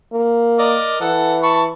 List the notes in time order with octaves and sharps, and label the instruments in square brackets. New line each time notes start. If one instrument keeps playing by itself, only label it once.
[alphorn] A#3
[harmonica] A#4 D5 D#5
[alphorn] E3 [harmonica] A4 F#5
[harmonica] A5 B5 C#6